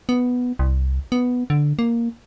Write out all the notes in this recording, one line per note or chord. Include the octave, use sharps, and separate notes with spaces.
B3
C2
B3
D3
A#3